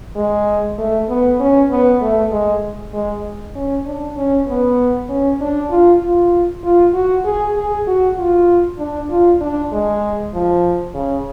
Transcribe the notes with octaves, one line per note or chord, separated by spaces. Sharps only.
G#3
A3
B3
C#4
B3
A3
G#3
G#3
C#4
D4
C#4
B3
C#4
D4
F4
F4
F4
F#4
G#4
G#4
F#4
F4
D4
F4
D4
G#3
F3
C#3